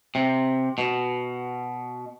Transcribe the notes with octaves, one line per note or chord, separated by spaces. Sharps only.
C3
B2